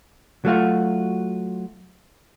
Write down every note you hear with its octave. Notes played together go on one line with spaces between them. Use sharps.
F#3 A3 F4 F#4